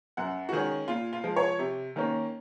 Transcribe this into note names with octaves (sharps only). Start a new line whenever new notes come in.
F#2 F#5
F#4
D#3 G#3 C#4 G#4
A#2 F4
F4
F3 G#3
C#5
C3
D#3 A#3 C#4